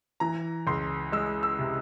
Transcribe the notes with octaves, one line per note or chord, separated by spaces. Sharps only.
E3 A#5
C#2 C6
G#3 E6
E6
C3